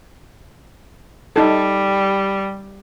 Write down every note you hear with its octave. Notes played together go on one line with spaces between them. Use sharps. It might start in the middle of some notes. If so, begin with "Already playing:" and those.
G3 D#4 A4